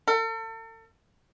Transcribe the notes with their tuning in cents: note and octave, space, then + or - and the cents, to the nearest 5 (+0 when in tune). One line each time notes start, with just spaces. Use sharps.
A4 +40